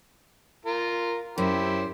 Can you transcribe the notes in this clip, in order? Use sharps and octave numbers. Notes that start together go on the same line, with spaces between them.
F4 A#4
F#2 E4 G4 C5